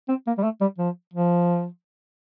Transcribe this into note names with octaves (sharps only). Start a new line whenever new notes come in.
C4
A#3
G3
A3
G3
F3
F3